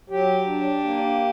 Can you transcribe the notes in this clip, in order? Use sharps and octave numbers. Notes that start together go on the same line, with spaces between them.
F#3 G4
D4
A#3